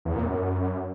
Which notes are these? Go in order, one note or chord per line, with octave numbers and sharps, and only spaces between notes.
E2
A#2
F#2